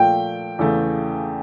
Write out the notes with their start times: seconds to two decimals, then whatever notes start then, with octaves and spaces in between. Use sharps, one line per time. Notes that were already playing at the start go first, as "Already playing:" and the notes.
Already playing: A#2 F3 A3 G5
0.59 E2 C#3 E3 A3